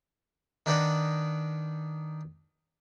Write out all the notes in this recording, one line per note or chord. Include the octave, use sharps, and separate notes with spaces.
D#3 D4 D#4 B4 D5 F#5